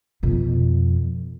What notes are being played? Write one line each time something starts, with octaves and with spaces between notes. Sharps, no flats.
F2 B2